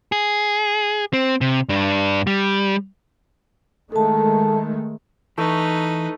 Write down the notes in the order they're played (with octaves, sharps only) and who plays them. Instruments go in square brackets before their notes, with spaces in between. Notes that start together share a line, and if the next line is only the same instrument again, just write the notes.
[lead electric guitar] G#4
C4
C3
G2 D4
G3
[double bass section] D#3 G#3 A3 [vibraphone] A4 A5
[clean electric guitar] E3 [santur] A3 [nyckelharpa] D#4 B4